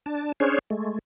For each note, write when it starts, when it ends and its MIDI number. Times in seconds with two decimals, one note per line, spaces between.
0.06 0.32 62
0.06 0.32 81
0.40 0.59 61
0.40 0.59 62
0.40 0.59 68
0.40 0.59 72
0.40 0.59 73
0.70 0.99 56
0.70 0.99 57